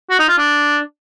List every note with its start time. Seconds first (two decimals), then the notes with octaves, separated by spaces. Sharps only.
0.10 F#4
0.19 D#4
0.29 F4
0.38 D4